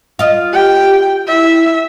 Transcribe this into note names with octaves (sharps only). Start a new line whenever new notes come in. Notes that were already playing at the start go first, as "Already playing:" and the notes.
F4 D#5
G4 G5
E4 E5